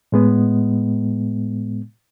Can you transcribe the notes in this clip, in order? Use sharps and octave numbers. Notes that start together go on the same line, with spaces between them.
A2 G#3 B3